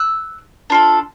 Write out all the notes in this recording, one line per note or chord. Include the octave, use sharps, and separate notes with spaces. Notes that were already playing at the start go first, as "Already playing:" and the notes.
Already playing: E6 F#6
D4 F4 A4